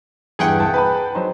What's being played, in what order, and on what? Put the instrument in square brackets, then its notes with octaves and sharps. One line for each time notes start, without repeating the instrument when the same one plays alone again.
[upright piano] E2 G2 E4 [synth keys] G#4 F#5 G5
[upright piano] C2 A5
B4 A5 B5
F#3 D#4 C5